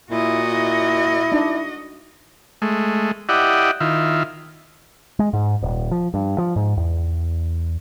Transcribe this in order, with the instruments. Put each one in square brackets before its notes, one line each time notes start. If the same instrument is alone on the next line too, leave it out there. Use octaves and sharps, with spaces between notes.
[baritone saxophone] A#2 [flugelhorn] E4 [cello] F#4 D#5
[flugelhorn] E4
[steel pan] D4 D#4
[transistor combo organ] G#3 A3
E4 G4 D5 D#5 F#5
D#3 E4 F4
[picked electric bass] G#3
G#2
D#1
F3
G2
F3
G#2
E2